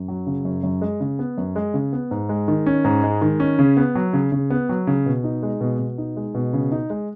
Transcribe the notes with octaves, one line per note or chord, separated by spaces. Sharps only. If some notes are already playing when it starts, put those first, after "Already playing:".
Already playing: F#2
F#3
C#3
F#2
F#2
G#3
C#3
B3
F#2
G#3
C#3
B3
G#2
G#3
D#3
C#4
G#2
G#3
D#3
C#4
C#3
B3
F#3
C#3
C#3
B3
F#3
C#3
B2
D#4
G#3
B2
B2
D#4
G#3
B2
C#3
D#4
G#3